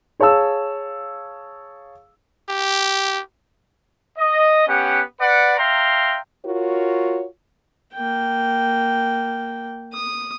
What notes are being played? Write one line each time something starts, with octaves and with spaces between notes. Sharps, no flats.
G#4 C#5 F5 A5 E6
G4
D#5
B3 C#4 G4 F#5
B4 D5 F#5
E5 F5 G5 A#5 C6
F4 F#4 A#4 C#5
A#3 G5
D#6